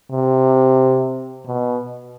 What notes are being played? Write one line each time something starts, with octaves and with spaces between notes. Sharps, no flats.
C3
B2